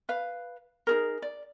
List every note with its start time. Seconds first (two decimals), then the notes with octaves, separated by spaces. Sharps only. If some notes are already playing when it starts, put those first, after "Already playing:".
0.09 B4 F5
0.87 D#4 G#4 A#4
1.22 D5